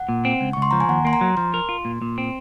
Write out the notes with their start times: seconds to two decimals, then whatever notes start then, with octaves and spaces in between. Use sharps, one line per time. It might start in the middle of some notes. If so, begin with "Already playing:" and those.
Already playing: F#5
0.09 A#2
0.25 C4
0.41 C#2
0.53 C#2 C#6
0.62 C6
0.71 F3 A#5
0.80 G#5
0.89 D#2 F#5
1.05 A#3 C6
1.13 A#5
1.21 F#3
1.37 F3 C6
1.54 A#4
1.69 F4
1.85 A#2
2.02 A#2
2.18 C4